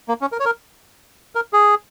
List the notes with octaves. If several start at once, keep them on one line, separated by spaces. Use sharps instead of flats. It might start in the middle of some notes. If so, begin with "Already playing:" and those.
A#3
C#4
A#4
C#5
A#4
A#4
G#4